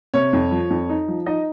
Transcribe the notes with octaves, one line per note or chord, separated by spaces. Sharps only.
C3 C#5
F2
F3
F2
D#4
F3
D#4 D#5